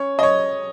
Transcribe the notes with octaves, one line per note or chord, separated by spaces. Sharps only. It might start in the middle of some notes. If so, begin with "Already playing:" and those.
Already playing: C#4 C#5
D#5
C#5